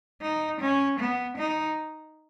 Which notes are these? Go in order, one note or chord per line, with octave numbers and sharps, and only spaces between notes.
D#4
C#4
B3
D#4